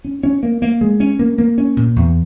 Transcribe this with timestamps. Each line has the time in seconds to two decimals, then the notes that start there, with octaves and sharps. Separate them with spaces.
0.04 C#4
0.23 C#4
0.43 A#3
0.62 A#3
0.81 G#3
1.00 C#4
1.19 A#3
1.38 A#3
1.58 C#4
1.77 A#2
1.96 E2